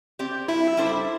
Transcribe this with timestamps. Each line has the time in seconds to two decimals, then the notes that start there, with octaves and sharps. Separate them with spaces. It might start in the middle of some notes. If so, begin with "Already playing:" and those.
0.19 C4 G4 D5
0.48 G2 E4 E5
0.77 G3 D4 A4 C5